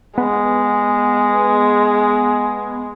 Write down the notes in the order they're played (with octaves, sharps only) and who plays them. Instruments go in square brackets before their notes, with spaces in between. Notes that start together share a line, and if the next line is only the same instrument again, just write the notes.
[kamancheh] G#3 [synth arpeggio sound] B3